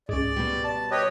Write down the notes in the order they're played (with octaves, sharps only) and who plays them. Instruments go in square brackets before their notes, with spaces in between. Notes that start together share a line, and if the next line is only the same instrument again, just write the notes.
[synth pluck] C#2 G#2 [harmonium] D5
[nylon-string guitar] B2 G3
[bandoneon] A5
[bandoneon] G4 B4 D#5 [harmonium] C#5